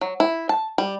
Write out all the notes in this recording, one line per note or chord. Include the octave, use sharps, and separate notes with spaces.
F#3
E4
A5
G3